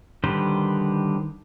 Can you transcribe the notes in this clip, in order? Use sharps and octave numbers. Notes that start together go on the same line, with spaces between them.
D3 D#3 G3 B4 C5